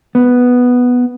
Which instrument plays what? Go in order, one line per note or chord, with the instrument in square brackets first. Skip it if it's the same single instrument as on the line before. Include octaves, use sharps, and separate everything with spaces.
[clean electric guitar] B3